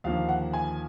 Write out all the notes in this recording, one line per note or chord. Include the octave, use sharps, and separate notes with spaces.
D#2 D3 F3 A#3 F5
F#5
G#5